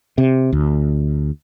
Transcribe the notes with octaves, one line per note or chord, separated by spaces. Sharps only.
C3
D2